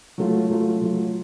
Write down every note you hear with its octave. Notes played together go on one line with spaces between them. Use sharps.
F#3 A3 F4
F#3 A3 F4
F#3 A3 F4